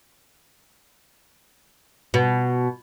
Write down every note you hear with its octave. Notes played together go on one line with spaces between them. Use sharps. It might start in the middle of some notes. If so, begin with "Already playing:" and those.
B2